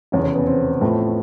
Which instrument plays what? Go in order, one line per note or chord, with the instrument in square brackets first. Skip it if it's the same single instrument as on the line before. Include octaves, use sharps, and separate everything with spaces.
[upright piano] F1 E2 C#3 [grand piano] C#4
[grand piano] C#4
B3
C4
[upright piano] A1 A2 F3 A3